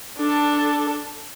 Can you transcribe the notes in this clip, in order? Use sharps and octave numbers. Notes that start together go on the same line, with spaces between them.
D4 A4